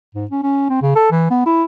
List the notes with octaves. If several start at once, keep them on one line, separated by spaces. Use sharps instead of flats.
G#2
C#4
C#4
C4
C#3
A4
E3
B3
E4